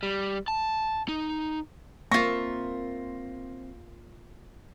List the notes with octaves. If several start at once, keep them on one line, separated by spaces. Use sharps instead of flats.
G3
A5
D#4
A#3 C4 F4 E5 C#6 A#6